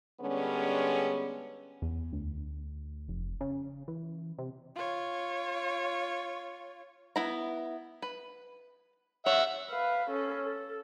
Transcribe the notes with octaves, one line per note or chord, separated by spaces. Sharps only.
D3 G3 G#3 B3 C#4
E2
D2
F1
C#3
E3
C3
F4 C#5
B3 E4 A#5
B4
C#5 E5 F#5
B4 F5
C#4 A4
A4